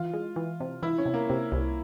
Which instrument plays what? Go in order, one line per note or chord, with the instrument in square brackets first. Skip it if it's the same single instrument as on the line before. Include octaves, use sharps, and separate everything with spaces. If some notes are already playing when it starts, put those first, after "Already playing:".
Already playing: [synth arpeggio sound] E3 [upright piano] F4
[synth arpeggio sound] G#3
E3
C3
[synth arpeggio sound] E3 [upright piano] E4
[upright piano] C#4
[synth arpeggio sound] C3
[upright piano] A#3
[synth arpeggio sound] C3
C2